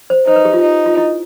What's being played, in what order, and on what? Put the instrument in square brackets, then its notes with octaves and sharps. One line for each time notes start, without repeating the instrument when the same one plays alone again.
[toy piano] C5
[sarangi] D#4 [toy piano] C5
[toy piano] B4
G4
F4
[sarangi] D#4
[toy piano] F4
E4